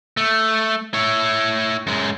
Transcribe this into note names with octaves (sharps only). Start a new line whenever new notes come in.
A3
E4 C#5
F#2 G#3